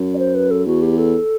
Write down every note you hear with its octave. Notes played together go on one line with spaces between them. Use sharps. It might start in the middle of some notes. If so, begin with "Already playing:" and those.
Already playing: F#2
D5
C5
B4
A4
E2 F#4
G4
A4